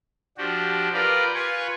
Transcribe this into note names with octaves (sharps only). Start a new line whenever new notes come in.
F3 D4 F#4 G4
F4 G4 A#4 B4 D5
F4 B4 G#5 C#6